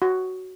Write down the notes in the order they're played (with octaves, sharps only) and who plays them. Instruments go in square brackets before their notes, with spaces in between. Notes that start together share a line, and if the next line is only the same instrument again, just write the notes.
[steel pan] F#4